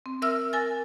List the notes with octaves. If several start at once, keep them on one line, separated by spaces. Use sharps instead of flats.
C4
A#4 E5 E6 F6
A#4 G#5 A6